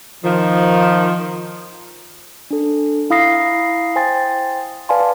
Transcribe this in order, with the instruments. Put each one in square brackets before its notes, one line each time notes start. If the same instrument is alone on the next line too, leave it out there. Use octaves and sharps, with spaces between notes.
[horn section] D#3 F3
[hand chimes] D4 A4
E4 F5 B5 D#6 A#6 C7
C5 G5 G#5 C6 D#6 A6
B4 D5 F5 G#5 A5 C6